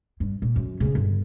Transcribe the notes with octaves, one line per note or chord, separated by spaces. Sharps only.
G2
A#2
F#2 D3
C#3 B3
G1